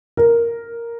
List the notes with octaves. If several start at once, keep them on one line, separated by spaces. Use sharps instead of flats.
A#4